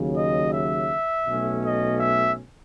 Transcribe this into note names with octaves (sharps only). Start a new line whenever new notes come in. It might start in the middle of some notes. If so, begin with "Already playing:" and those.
Already playing: D#2 C#3 F#3
D#5
E5
B1 B2 A3 C#4
D#5
E5